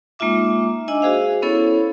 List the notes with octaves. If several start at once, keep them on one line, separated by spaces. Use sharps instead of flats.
G#3 A#3 D#4 F4 E5 D6
D4 D#5 G#5 E6
F#4 G#4 C5 F5
B3 C#4 E4 A4 C#5